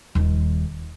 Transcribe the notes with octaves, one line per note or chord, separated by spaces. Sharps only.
D#1 D#2